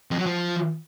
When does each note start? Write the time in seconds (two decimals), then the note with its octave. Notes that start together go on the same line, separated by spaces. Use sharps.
0.11 F2
0.19 F#3
0.26 F3